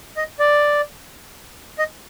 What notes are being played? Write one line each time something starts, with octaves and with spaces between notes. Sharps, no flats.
D#5
D5
D#5